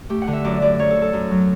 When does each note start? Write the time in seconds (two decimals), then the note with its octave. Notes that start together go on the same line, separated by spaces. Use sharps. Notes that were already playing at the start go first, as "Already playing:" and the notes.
0.09 A3 G4
0.22 F#5
0.27 D3
0.33 E5
0.45 F#2 D5
0.62 F#2 D5
0.79 F#2 C#5
0.90 A4
0.96 F#2
1.02 A4
1.13 F#2
1.31 F#3